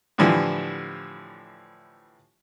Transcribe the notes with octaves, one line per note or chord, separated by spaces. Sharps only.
A2 D3 E3 F3 G3